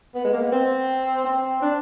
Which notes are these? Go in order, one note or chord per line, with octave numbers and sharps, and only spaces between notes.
B3
G#3
A#3
B3
C4
C4
D4